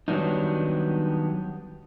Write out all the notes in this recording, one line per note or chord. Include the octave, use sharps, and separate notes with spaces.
D#3 F#3 G3 B3 D4 D#4